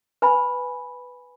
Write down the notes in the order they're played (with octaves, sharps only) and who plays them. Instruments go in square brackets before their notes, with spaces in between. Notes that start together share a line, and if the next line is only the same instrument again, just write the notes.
[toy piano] B4 G#5 B5